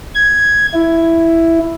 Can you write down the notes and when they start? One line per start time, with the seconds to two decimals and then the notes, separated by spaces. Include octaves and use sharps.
0.15 G#6
0.74 E4